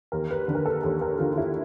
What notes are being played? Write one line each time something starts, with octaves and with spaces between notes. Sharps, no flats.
D#2 A#4
B4
D3
A#4
A4
D#2 A4
A#4
D3 F4
F4
E4